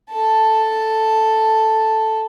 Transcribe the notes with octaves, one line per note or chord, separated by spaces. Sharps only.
A4 A5